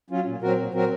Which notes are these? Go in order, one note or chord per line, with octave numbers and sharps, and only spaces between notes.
F#3 C#4 F4
A#2
F#3 C4 F#4 A#4
A#2
F#3 C4 F#4 A#4